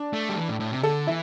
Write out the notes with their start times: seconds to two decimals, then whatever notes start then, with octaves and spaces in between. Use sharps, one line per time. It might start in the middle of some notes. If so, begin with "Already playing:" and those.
Already playing: D4
0.13 A3
0.29 G3
0.38 E3
0.49 A2
0.60 A2
0.72 C3
0.83 D3 A4
1.07 E3 E4